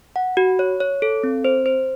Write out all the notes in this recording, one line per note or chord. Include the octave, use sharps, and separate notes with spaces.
F#5
F#4
C#5
C#5
A4
C4
C5
C5